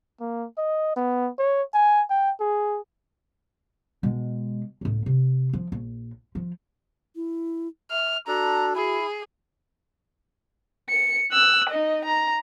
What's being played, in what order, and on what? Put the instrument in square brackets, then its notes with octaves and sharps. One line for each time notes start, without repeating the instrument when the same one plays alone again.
[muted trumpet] A#3
D#5
B3
C#5
G#5
G5
G#4
[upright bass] B2 G#3
C#2 A2
C3
F3
A#1
F3
[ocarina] E4
[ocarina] E5 [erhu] F6
[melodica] D4 A4 [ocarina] F#4 [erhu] A#5
[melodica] E4 [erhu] G#4
[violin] C#7
E6 F#6
D#4 D#5
A#5